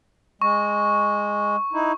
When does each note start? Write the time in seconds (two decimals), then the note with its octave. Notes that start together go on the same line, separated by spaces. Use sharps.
0.42 G#3 C#6
1.73 D#4 E4